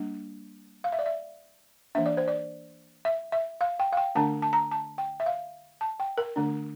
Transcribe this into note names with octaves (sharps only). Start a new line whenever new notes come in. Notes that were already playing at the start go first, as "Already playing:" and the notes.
Already playing: G3 A#3 D4
F5
E5
D5
E5
E3 A#3 D4 E5
D5
C5
D5
E5
E5
F5
G5
F5
G5
D3 A3 D4 A5
A5
A#5
A5
G5
E5
F5
A5
G5
A#4
D3 A3 D4